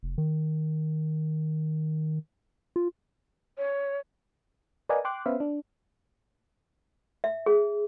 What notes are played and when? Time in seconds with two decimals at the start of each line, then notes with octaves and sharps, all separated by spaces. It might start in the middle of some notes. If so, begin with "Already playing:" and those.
0.03 F1
0.18 D#3
2.76 F4
3.58 C#5
4.89 A#4 B4 D5 D#5 F#5 G#5
5.05 G5 C6 D6 F#6
5.26 B3 C#4 B4 C5 E5 F5
5.40 D4
7.24 E5
7.46 G#4